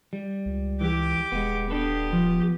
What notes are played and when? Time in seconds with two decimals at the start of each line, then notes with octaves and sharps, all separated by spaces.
0.13 G3
0.46 C#2
0.81 E3 G4 D6
1.32 D#1 G#3 B3
1.70 B3 D4 G4 A4 B4
2.13 F3